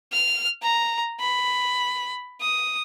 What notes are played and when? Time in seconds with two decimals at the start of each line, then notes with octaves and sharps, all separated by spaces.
0.12 F6
0.62 A#5
1.20 B5
2.41 D#6